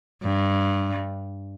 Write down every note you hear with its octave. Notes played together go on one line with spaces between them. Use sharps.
G2